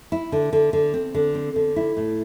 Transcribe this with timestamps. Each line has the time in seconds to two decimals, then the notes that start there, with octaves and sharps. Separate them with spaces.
0.12 E4
0.32 D3
0.53 D3
0.73 D3
0.94 C4
1.14 D3
1.35 C4
1.56 D3
1.76 E4
1.97 A2